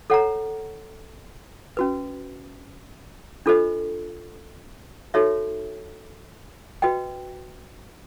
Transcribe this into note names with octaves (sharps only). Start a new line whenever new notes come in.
A4 C#5 F#5 A#5
C#4 F#4 B4
D4 F4 A4 C5 D#5
D#4 F#4 A4 C#5 E5
F#4 B4 D#5 G5